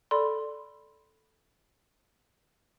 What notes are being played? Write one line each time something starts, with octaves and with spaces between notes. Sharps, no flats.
A4 D5 B5 C6